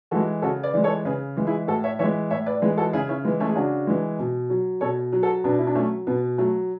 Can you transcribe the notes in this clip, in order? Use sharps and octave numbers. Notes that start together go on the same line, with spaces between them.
E3 G#3 F#4 A4
C#3 F#4 A4
B4 D5
E3 G#3
A4 C#5
C#3 G#4 B4
E3 G#3
E4 G#4
A2 F#4 A4
C#5 E5
E3 G#3 C#5 E5
A2 C#5 E5
B4 D5
E3 G#3 G#4 B4
F#4 A4
C#3 E4 G#4
C#4 E4
E3 G#3 B3
A3 C#4
G#4
C#3 D4 F#4
E3 G#3
B2
F#3
B2 A4 C#5
F#3
F#4 A4
B2 B3 D4
E4
D4
F#3 A3 C#4
B2 B3
F#3 A3